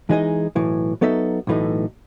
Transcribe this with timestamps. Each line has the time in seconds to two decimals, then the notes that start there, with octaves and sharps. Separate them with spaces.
0.09 E3 G#3 D#4 G#4 D#5
0.55 B1 A2 E3
1.01 F#3 B3 D#4 A4 E5
1.47 B1 A2 E3 A3 D#4